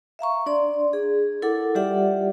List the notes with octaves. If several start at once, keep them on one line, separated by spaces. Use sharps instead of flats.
E5 F5 A#5 C#6
D4 D5 C6
G#4
E4 A4 A#4 F#5 D6
G3 F4 G4 D5 E5 F#5